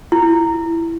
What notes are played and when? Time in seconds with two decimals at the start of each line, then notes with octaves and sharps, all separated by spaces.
0.12 E4